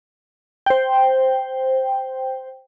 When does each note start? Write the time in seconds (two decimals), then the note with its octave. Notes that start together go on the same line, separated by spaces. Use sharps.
0.66 C5 G5